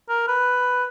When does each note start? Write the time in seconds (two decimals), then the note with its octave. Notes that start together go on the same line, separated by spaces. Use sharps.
0.09 A#4
0.28 B4